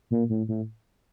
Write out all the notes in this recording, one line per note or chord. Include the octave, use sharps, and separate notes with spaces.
A#2
A2
A2